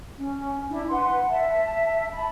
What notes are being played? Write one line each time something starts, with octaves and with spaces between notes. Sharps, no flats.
C#4
D4 E4
B4 F#5 C6
E5 A5
A5 B5